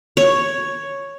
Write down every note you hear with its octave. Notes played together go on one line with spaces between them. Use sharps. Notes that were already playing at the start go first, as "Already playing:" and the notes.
C#5